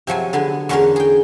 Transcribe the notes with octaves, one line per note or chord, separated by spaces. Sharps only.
C3 F3 F#3 G#5
D3 B3 G#5
E2 D3 C#4 F#4 A#4 F5
G#4 G5